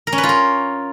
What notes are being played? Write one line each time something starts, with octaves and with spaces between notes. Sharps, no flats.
A#4
C#4
B4
F4
A#4